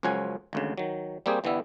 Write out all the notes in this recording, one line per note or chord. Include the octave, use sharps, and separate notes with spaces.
C#2 F#2 F3 C#4 F#5 G#5
G#1 D2 C#3
D#3 F#3
G3 A#3 C4 G4 G#4
G1 E3 G3 B3 E5